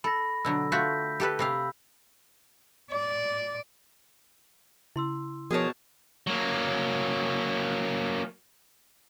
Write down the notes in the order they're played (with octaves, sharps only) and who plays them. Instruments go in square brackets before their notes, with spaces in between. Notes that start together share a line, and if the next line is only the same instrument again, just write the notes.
[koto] A4 [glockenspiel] B5 A#6
[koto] B2 D3 F#3 [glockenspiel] E6
[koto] A3 F4 F#4 [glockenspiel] G6 B6
[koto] G4 A4 B4
[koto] C3 G4 F5 [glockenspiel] B5 E6
[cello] D5
[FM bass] C#3 [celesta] E4 C6 E6
[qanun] B2 A5 [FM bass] F3 [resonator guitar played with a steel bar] G#4 A#4 C#5
[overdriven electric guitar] F#3 A#3